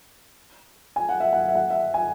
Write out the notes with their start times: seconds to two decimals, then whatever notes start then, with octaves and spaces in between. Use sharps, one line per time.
0.96 G#5
1.09 F#5
1.20 E5
1.33 F#5
1.48 E5
1.55 F#5
1.70 E5
1.94 G#5